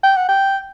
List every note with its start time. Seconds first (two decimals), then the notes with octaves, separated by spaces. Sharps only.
0.03 G5
0.16 F#5
0.28 G5